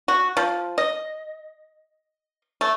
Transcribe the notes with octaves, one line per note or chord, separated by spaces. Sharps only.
F#4
F3
D#5
A3